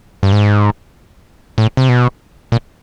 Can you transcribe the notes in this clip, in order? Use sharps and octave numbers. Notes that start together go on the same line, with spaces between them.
G2
G#2
A2
C3
B2
A#2